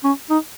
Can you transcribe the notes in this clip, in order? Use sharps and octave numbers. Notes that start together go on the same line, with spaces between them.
C#4
D#4